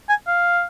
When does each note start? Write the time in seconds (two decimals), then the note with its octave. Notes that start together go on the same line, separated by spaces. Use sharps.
0.09 G#5
0.27 F5